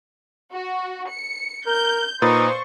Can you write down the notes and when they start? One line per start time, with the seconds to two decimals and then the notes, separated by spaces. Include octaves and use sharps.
0.51 F#4
1.09 C#7
1.67 A#4 G6
2.22 A#2 D#4 B4 C5 C#6 A6